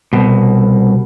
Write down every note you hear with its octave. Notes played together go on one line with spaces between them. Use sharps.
C2 B2